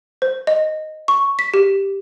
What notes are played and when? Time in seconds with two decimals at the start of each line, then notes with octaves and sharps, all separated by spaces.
0.22 C5
0.47 D#5
1.08 C#6
1.39 B6
1.54 G4